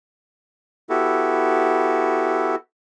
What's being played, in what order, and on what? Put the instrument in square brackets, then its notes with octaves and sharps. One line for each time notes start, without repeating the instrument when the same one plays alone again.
[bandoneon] B3 E4 F#4 G4 A4